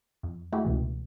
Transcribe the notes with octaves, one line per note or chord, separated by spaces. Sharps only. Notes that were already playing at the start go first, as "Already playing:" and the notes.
F2
G#3 A3 E4 F#4 G4
C#2 B2 E3